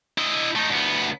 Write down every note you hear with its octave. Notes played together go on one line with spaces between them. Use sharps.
E4 D#5
A3 D#4
D2 B3